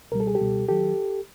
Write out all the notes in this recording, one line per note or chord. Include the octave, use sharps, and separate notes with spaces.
C#2 B2 G3 A#4
A4
G#4
G4 A4
C#2 B2 G3
D#3 F#3 G4 A4